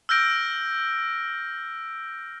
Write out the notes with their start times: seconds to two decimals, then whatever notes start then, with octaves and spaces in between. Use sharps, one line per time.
0.09 E6 F6 G6 A#6 D7